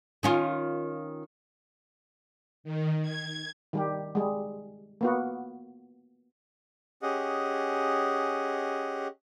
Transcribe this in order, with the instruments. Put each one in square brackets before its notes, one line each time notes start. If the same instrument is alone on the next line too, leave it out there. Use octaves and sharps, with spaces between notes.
[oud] D#3 C#4 F4
[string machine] D#3
G#6
[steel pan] D#3 G3 G4
G3 G#3
A#3 B3 F#4
[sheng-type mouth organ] C#4 G4 G#4 D#5 F#5